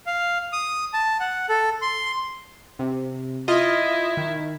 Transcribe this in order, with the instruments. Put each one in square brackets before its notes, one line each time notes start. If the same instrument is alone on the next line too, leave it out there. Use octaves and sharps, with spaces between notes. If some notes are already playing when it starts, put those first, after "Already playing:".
[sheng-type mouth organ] F5
D#6
A5
F#5
A4
C6
[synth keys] C3
[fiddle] E4 [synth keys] F4 D#5
[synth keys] D#3